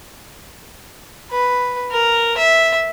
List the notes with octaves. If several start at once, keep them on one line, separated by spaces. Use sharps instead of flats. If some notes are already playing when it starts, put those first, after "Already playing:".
B4
A#4
E5